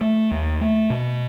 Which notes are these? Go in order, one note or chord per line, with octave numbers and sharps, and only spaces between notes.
A3
D#2
A3
B2